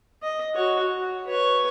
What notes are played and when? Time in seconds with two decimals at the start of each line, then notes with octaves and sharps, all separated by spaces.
0.23 D#5
0.54 F#4 C#5
0.93 F#4
1.27 B4 C#5